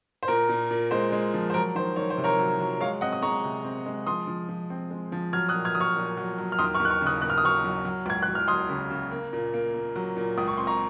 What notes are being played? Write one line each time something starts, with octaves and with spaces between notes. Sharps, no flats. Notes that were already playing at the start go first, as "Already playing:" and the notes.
C5
A#2 A#4
A#2
A#2
G#3 C5
G#3
F3
C5
F#3 A#4
D#3 C5
D#3 C#5
C5
C3
A#4 C#5
F#3
F#3
G#3 C#5 F5
C4 D#5 F#5
D#6
G#3 A#5 C#6
C3
C4
G#3
F3 C6 D#6
F3
F3
C4
G#3
F3
F#3 F6 G#6
D#6 F#6
A#2
F6 G#6
F#3 D#6
C#6 F6
A#2
F#3
F#3
F6
D#2 C6 D#6
C#6 F6
D#2
F#6
C#6 F6
C#3
D#6 F#6
A#3 F#6
F6
D#6
F#3 C#6 F6
F#3
F#3
C#2 G#6
F#6
F#3
F6
F#3 C6 D#6
C#3
C#3
A#3
A#2
A#3
A#3
F#3
A#2
C#2 D#6
C#6
C4 C6
A#5 C#6